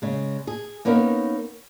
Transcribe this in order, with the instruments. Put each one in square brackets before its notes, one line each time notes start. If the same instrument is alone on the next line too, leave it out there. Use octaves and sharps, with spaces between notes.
[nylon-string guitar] C#3 G#3
G#4
A#3 B3 C#4 D#4 A#4